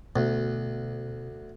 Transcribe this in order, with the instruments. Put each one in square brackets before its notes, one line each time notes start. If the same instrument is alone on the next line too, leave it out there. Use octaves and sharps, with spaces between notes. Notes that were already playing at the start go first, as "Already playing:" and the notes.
[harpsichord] D2 [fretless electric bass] B2